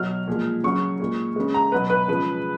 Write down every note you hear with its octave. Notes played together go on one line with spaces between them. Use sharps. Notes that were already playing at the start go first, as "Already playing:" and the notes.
Already playing: B2 F#3 F6
A#2 F3 G#3
C#3 F#3 C#6
A#2 G#3
C#3 G#3
A#5
B2 F#3 B4
B4
C#3 F3 G#3 B4